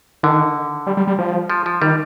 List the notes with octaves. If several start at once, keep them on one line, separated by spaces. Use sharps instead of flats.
D3 D#3
G3
G3
G3
F3
F3
F3
D#3 G3